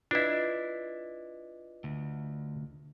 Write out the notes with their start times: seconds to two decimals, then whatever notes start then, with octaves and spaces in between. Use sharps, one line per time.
0.11 D4 E4 F4 B4 D#5
1.84 D2